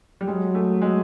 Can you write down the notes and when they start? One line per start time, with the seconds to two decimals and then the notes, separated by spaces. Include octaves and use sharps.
0.21 G3
0.27 F#3 G#3
0.55 A3
0.82 G#3